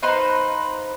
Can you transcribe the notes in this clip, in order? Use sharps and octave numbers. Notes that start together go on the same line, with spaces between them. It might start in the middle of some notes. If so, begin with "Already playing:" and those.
D#4 B4 C5 F5